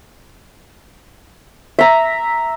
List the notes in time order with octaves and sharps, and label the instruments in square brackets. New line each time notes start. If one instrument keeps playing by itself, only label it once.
[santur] E5 A#5